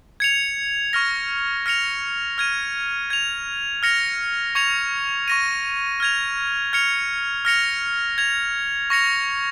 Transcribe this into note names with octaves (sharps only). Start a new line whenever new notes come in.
G#6 C#7 F7
C#6 F6 A#6
F6 A#6 C#7 F7
F6 G#6 D#7
G#6 F7
F6 A#6 C#7 F7
C#6 G#6 C#7 F7
C#6 A#6 D#7
F6 G#6 F7
F6 G#6 C#7 F7
F6 A#6 C#7 F7
G#6 F7
C#6 A#6 C#7 F7